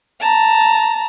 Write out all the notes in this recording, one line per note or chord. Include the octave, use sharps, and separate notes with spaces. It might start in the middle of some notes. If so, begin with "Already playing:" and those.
A5 A#5